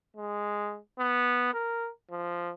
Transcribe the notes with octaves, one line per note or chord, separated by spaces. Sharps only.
G#3
B3
A#4
F3